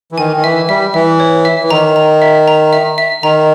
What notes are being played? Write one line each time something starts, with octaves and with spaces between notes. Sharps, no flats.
E3
D#3 G#5
D#3
E3 E5
G3 E5
E3 E5
C#5
E5
E3
D#3 A#5
A#5
E5
A#5
E5
E5
D#3 A#5